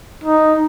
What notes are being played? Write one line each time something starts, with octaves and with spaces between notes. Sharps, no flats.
D#4